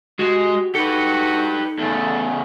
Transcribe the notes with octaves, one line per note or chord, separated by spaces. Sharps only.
G#3 F#4 G4
D#4 F#4 G4 A4 B4
E2 C#3 A3